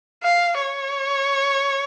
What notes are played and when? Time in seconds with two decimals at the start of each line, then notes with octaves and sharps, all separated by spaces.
0.23 F5
0.62 C#5